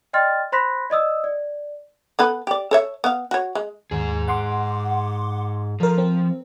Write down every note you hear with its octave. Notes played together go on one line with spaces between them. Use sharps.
D5 D#5 G5 C6 F6 A6
C5 B5 C6 F#6 A#6 B6
D5 D#5 D#6 E6
D5
B3 A4 B4
G4 D5
A4 C#5 E5
B3 F5
F#4 C#5
G#3
D#2 G#2 G#4
F#5 C6 D6
F3 A4 A#4
C4